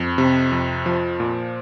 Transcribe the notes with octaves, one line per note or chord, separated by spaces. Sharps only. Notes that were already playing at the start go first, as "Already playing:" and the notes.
Already playing: F2
C3
F2
F3
A#2